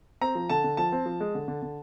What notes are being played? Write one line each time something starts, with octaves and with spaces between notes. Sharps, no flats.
C4 A#5
F3
D3 A5
D3
F3 A5
C4
F3
G#3
D3
D3
D3